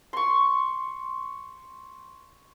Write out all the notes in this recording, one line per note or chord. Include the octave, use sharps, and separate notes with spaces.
C6 C#6